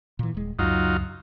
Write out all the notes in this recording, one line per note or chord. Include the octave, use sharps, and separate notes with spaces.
A#2 E3
D#1 G#3
C#2 F#2 F#3 D#4 F4